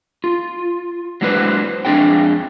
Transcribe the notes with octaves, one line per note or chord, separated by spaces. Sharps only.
F4
F#3 G#3 D4 E4 B4 C5
F2 G#3 D4 A4 C#5 G5